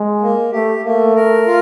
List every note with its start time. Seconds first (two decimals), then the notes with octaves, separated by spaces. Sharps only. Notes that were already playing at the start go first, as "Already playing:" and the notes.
Already playing: G#3
0.22 A#3
0.52 A3 G4
0.84 A3 A#3
1.15 A#4
1.46 F4